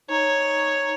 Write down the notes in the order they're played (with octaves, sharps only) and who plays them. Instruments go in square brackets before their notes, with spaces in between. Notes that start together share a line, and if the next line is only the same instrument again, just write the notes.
[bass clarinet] D#4 [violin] C#5